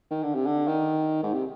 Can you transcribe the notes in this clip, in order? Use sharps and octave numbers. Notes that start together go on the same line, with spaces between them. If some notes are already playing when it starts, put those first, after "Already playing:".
D#3
D3
C3
D3
D#3
G#2
C3